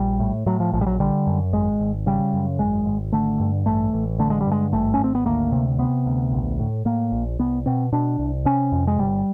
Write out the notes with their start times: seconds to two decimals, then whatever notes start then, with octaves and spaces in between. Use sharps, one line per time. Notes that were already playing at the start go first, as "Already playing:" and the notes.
Already playing: A#1 G3
0.20 A2
0.46 A2 F#3
0.60 F3
0.73 A#1 F3
0.81 G3
0.86 F#3
1.00 D3 G3
1.27 F#2
1.53 G#1 G#3
1.80 G#1
2.06 C#3 G3
2.33 F#2
2.59 G#1 G#3
2.86 G#1
3.13 D3 A3
3.40 G2
3.66 A1 A3
3.93 A1
4.19 D3 A3
4.30 G#3
4.41 G3
4.47 G2 G#3
4.73 G#1 A3
4.94 C#4
4.99 G#1 C4
5.15 B3
5.26 D2 A#3
5.52 C3
5.79 C3 B3
6.06 D2
6.32 A#1
6.59 A2
6.85 A2 A#3
7.12 A#1
7.39 C2 B3
7.66 B2 C4
7.92 B2 D4
8.19 C2
8.45 C3 C#4
8.72 F2
8.87 G#3
8.99 G1 G3